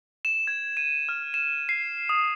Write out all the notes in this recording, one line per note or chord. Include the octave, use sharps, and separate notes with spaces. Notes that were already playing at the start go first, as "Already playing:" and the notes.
E7
G#6
D#7
F6
E7
C7
D#6